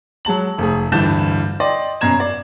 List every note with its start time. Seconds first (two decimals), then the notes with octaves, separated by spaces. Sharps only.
0.25 F#3 G#3 A5 F#7
0.58 F1 A3 G#4
0.92 D1 G2 E3 G6 A6 E7
1.60 D5 D#5 G5 C6
2.01 F#2 B2 A#5 G#6 E7
2.20 D5